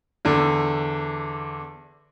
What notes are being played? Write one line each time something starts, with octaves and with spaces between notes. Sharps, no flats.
E2 D3